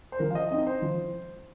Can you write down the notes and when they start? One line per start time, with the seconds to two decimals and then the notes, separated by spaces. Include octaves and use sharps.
0.12 C5
0.19 F3 A#4
0.31 F5
0.35 D#5
0.50 C4 D#4 D#5
0.67 C5
0.82 F3